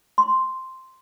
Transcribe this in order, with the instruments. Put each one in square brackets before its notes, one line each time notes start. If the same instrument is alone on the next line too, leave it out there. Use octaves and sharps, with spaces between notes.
[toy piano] C6